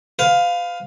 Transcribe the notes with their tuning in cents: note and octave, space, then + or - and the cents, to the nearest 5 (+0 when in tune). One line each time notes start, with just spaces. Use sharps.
B4 +35 F5 +10